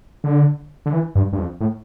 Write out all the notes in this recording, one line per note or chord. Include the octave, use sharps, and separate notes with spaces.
D3
D3
E3
G2
G2
F2
A2